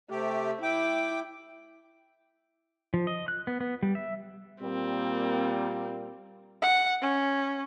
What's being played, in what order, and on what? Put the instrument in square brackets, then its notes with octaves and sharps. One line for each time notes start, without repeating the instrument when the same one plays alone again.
[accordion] C3 G4 [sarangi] A3
[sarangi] E4 [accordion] G5 D6
[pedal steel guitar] F3
D#5
F#6
B3
B3
G3
E5
[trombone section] A#2 G3 A#3 [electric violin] C4
[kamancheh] F#5
C#4